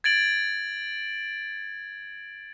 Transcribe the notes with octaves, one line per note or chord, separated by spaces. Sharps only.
G#6 A6 D7 F#7